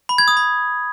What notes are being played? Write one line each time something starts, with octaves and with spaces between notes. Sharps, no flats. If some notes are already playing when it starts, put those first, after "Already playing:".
B5
G#6
D#6
B5